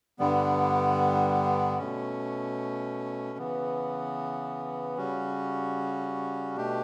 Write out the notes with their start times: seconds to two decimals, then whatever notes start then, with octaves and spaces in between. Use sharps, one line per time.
0.19 G2 D3 G3 B3
1.78 B2 A3 C#4
3.38 C#3 E3 B3
4.97 C#3 G3 C#4 F#4
6.56 B2 A3 D4 G4